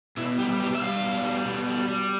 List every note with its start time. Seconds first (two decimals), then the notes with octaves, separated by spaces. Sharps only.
0.17 B2 E4
0.38 G3 G4
0.60 B2 G4
0.75 E5
0.82 G3 F5
1.03 B2
1.24 G3
1.46 B2
1.68 G3
1.89 G3